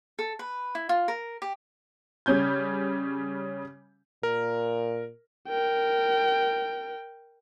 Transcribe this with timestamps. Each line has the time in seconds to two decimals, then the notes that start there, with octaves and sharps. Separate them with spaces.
0.19 A4
0.39 B4
0.75 E4
0.89 F4
1.08 A#4
1.42 G4
2.26 C#3 G3 C#4 G6 G#6
4.23 A#2 A#4
5.49 A#4 G5